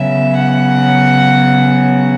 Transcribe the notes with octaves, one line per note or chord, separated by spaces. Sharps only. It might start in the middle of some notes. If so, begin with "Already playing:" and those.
Already playing: C#3 F#3 B3 E5
F#5